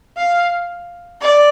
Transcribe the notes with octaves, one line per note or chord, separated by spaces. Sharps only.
F5
D5